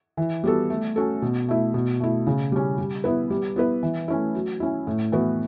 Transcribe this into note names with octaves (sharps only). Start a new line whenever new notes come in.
E3
G3 B3 F#4 A4
A3
C#4 F#4 A4
B2
A3 E4
B2
A3 E4
C#3
G3 C#4
G3
B3 E4 B4
G3
B3 E4 B4
E3
A3 C#4 E4
F#3
C#4 E4
A2
E3 B3 F#4 B4